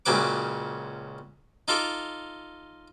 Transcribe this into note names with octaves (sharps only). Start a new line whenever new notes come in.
C#2 A#2 C#3 F#3 B4 D6
D#4 F4 A4 D6